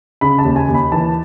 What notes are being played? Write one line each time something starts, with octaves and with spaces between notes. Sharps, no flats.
C#3 B5
A5
D#2
G#5
D#2
B5
E3 A5